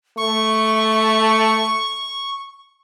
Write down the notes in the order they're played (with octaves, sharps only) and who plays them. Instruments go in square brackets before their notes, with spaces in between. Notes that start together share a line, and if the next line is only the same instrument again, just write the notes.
[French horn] A3 [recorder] C#6